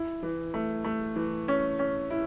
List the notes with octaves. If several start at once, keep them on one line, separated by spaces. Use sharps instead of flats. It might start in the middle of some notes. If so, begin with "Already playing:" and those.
Already playing: E4
E3
A3
A3
E3
C#4
C#4
E4